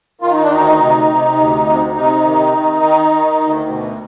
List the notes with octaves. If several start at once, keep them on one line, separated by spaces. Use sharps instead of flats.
D#3 F4
D#4
D4
D2 D#4
C3
C3
D2
C3
C3 D#4
D#3
D#3
D#3
D#3
D2
B2